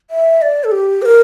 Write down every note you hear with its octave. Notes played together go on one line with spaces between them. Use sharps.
E5
D5
A4
G4
C5
A#4